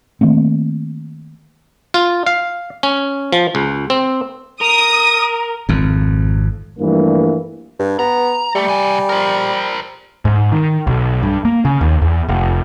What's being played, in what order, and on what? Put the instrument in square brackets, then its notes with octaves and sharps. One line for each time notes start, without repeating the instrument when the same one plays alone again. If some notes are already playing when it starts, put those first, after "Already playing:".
[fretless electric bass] D#3 A3 A#3 C4
[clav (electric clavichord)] F4
F5
C#4
F3
C#2
C4
[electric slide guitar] A#4 [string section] D#6
[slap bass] G#1 F2
[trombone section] G2 E3 F3 G3 A3 A#3
[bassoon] G2
[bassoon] B3 [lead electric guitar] A#5
[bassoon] G3 [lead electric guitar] A3
[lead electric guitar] C2 G#5
A#4 C5
[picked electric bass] G#2
D#3
B1
G2
A#3
C#3
D#2
E2
F1